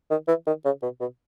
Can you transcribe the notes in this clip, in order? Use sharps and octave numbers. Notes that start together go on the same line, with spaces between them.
D#3
E3
D#3
C#3
B2
B2